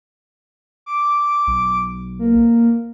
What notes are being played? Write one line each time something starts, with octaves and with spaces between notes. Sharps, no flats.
D6
B1
A#3